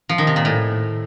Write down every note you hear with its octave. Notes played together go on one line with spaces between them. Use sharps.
F3
D#3
C3
A#2
A2